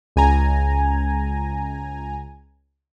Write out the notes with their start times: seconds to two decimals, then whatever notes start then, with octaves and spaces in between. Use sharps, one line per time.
0.16 C#2 G#5 A#5